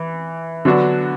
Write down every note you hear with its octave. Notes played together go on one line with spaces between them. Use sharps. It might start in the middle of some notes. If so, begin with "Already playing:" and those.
Already playing: E3
D3 F#3 B3 D4 F#4